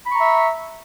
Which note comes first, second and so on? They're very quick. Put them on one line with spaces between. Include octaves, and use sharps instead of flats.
B5 C#6 A#5 E5